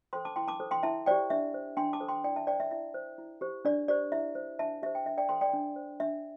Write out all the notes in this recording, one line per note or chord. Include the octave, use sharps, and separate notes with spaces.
A4 C5 G5 C6
A5 D6
E4 G5 C6
A5 D6
A4 C5
G5 C6
E4 E5 A5
G4 C5 D5 G5
D4 E5
C5
D4 G5 C6
A5 D6
A4 C5
G5 C6
E4 D5 G5
E5 A5
C5 D5 G5
E5
E4 E5
C5
E4
G4 C5
D4 D5
G4 C5 D5
E4 E5
C5
D4 E5 A5
G4 C5 E5
G5
D4 E5
D5 G5
A4 C5 G5 C6
D5 G5
D4
C5
D4 E5